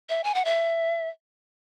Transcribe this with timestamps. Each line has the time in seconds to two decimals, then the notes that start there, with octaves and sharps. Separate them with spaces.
0.09 E5
0.24 G#5
0.35 F#5
0.45 E5